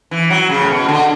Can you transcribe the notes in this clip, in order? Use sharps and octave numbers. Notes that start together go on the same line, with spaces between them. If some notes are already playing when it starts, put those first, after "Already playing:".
E3
F#3
C#3
A2
B2
D3